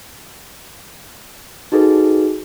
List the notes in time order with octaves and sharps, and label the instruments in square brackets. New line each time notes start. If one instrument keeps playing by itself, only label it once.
[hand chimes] D#4 F#4 G#4 A4 B4